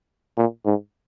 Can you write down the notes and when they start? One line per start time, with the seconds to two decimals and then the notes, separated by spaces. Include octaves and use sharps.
0.37 A#2
0.65 G#2